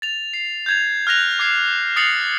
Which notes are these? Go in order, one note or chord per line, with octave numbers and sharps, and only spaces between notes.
A6 F7
C7
G6 G#6 F7
F6 F#6 A#6 F7
D6 G#6 C7
D#6 A6 C7 C#7 F7 F#7